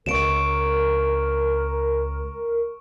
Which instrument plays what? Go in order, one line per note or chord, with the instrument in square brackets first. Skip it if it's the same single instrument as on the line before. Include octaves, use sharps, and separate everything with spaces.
[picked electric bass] C#2 [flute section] A#4 [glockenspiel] C#6 D7 E7